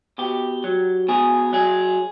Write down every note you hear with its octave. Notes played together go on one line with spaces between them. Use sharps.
B2 G4
F#3
B2 G#4
F#3 G#4